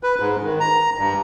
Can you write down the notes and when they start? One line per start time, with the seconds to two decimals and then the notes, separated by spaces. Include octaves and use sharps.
0.03 B4
0.20 G#2
0.44 D#3
0.60 A#5
0.99 G2